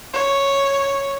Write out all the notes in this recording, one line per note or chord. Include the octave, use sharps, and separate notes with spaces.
C#5